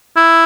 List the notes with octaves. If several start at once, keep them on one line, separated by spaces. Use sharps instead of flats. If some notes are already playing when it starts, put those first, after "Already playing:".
E4